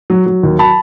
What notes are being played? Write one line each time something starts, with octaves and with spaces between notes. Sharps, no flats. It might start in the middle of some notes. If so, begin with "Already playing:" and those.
F#3
F#3
D#2
A5 B5